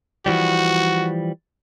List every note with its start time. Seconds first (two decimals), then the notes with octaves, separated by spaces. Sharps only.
0.26 E3 F3 G3 F#4